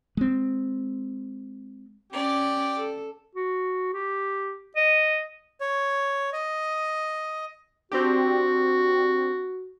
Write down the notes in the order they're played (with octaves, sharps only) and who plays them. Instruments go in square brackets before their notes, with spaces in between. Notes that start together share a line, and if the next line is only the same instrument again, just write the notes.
[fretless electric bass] G#3 C4
[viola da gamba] C#4 [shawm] G4 [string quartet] D5
[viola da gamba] A4
[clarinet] F#4
G4
D#5
[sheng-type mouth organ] C#5
D#5
[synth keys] C4 D4 G4 [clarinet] F#4